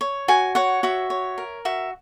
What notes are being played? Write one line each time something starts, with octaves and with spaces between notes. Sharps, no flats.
C#5
F#4 G#5
C#5 F#5
F#4 E5
C#5
A#4
F#4 E5